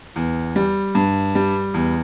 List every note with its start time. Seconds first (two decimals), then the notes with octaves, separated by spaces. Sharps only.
0.16 E2
0.56 G3
0.95 G2
1.35 G3
1.74 E2